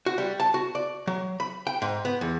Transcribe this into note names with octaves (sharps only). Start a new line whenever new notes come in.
F#4
G3
A5
F#4
D5
F#3
B5
G5
G#2
B3
E2